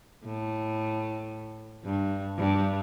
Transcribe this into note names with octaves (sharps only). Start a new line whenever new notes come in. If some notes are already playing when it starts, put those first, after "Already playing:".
A2
G2
G2